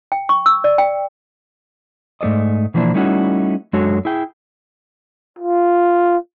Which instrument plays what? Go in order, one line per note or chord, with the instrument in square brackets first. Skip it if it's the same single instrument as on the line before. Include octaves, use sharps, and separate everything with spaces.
[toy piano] G5
C#6
E6
D5
G5
[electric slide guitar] G#2 A3 A4 D5 D#5
B2 E3 F3 A#3 D4 E4
G3 A3 C#4 D#4 E4 F#4
F#2 G#3 D4 F#4 A4 C#5
E4 G#4 G5
[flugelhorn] F4